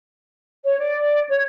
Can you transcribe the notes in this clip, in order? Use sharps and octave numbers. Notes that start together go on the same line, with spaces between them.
C#5
D5
C#5